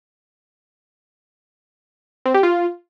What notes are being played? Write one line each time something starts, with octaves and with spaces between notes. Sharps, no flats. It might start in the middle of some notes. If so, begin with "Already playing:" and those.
C4
G4
F4